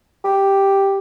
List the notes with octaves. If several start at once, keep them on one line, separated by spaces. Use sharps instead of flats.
G4